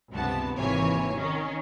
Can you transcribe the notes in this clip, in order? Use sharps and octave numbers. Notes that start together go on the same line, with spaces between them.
C#2 G2 C3 B3 A5
G#1 C3 E3 A#3 C#5 G#5
D#3 C#4